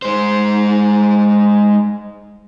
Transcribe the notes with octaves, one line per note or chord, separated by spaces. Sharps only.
G#3 C5